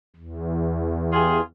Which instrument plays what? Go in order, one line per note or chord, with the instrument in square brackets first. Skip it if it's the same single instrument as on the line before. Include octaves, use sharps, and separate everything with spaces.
[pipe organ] E2
[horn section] F4 G4 G#4